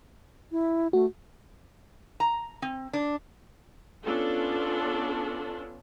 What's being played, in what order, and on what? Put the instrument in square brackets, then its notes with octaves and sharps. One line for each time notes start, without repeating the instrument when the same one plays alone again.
[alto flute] E4
[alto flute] A3 [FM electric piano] F#4
[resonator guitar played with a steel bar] A#5
C4
D4
[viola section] B3 C#4 D4 F4 A4